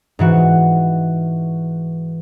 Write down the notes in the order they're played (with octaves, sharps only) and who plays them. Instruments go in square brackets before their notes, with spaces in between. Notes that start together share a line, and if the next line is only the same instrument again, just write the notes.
[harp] G#2 E3 F#4